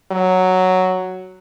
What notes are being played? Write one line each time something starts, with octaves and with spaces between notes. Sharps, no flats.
F#3